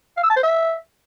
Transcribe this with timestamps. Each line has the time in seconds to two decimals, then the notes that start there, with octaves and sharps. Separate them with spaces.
0.17 F5
0.23 E6
0.30 A5
0.36 C5
0.43 E5